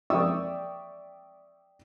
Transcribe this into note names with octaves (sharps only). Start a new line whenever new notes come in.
D5 E5 G5 C#6 D#6 E6